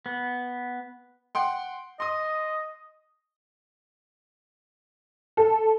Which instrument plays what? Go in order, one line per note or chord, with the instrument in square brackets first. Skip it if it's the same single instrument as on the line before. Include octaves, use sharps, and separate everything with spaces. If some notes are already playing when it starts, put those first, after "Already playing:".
[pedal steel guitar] B3
[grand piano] F#5 G5 C6
[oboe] D#5 [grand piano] C6 D#6
[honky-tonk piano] A4